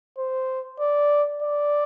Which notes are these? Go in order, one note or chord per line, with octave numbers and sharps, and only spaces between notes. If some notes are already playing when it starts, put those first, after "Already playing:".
C5
D5
D5